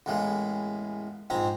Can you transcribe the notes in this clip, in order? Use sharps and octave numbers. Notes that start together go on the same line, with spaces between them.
A1 E2 A2 G#3 A#3
A#1 G#2 C4 A#5